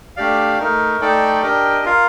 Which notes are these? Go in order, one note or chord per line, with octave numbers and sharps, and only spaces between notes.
A3 D4 G4 D5 F5
A3 D#4 A#4
A3 D#4 A4 D5 G5
D4 G4 A#4 D#5 G5
F4 A#4 F5